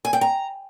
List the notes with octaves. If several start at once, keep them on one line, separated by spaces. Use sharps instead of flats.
G#5
G5
A#5